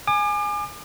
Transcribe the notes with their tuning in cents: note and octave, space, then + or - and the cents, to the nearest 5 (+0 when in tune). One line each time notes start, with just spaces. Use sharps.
G#5 +0 D6 +40